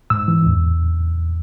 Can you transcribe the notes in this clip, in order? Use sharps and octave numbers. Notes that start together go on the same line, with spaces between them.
G#2 E6
E3
E2